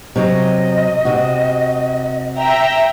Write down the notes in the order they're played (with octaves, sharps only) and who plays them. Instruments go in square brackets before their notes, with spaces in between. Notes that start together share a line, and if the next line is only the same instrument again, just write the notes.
[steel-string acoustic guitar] C3 F#3 [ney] D#5
[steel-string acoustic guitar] C3 F#4
[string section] E5 G5 A#5